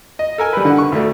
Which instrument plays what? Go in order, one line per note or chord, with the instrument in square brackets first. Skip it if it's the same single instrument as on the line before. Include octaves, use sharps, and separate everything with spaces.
[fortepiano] D#5
A4 A#4 G#5
G3 B4
D3 F#5
C#6
D2 A3